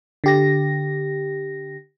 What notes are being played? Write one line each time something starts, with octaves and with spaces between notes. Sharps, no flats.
D3 G4 A#6